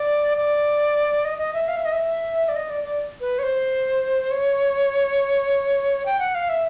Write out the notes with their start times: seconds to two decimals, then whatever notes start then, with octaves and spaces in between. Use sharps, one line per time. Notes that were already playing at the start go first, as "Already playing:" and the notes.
Already playing: D5
0.37 D5
1.25 D#5
1.38 D#5
1.53 E5
1.68 F5
1.76 E5
1.85 D#5
1.93 E5
2.48 D5
2.56 D#5
2.70 D5
2.84 D5
3.20 B4
3.39 C#5
3.43 C5
4.31 C#5
6.06 G5
6.19 F#5
6.35 F5
6.49 E5